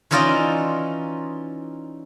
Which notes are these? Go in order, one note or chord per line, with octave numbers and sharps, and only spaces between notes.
E3 C#4 D#4 F4 D5 D#5